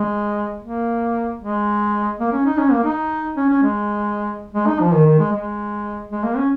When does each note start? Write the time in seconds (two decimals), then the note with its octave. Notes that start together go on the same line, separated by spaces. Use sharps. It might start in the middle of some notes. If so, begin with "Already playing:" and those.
Already playing: G#3
0.63 A#3
1.41 G#3
2.19 A#3
2.32 C#4
2.45 D#4
2.58 C#4
2.72 A#3
2.84 D#4
3.36 C#4
3.50 C#4
3.63 G#3
4.54 G#3
4.67 D#4
4.80 F3
4.94 D#3
5.06 D#3
5.19 G#3
5.33 G#3
6.11 G#3
6.24 A#3
6.37 C#4